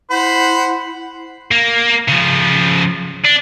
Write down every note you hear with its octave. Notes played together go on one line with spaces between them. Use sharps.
E4 C5 F#5 B5
A#3
C#3 F3
D4